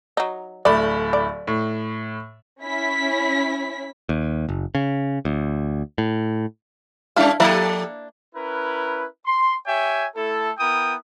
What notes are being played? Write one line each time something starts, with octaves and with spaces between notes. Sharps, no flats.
F#3 D#4
D1 A3 D5 B5
D5
A2
C#4 E4 B6
D#2
F#1
C#3
D2
A2
G3 C#4 D4 E4 A4 F5
F3 A#3 D4 E4 G4 A4
C#4 E4 A#4 B4
C6
G4 C#5 E5 G5 G#5
A3 E4 A4
B3 E4 A#4 G5 D#6